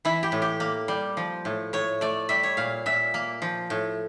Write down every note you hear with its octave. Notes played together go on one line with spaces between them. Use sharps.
E3 E4
G4
A2
G4
A#3
G3
F3
A2
A2 C#5
A3 D5
G3 E5
C#5
A#2 F5
A#2 E5
A#3
F3
A2